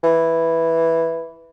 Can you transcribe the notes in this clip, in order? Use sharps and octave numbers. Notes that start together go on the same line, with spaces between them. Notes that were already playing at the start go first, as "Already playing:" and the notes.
E3